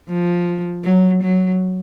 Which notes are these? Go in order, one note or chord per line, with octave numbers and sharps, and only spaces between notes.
F3
F#3
F#3